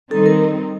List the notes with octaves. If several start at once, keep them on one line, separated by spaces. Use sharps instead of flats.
D#3 G3 C4 D#4 A4
A#4